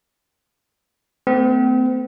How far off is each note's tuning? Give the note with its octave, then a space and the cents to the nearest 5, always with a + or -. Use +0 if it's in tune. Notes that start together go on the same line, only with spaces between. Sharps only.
A3 +20 C4 -45